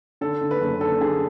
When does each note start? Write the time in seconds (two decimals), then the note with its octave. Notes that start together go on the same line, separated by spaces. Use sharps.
0.21 D3 A4
0.41 D3
0.51 B4
0.61 F#1
0.81 D3 A4
1.01 D3 G#4